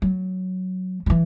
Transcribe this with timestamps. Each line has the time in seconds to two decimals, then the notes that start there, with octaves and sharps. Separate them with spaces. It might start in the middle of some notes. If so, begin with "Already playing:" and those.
0.02 F#3
1.06 F#3
1.10 E3